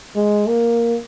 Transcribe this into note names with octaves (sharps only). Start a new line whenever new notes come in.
G#3
A#3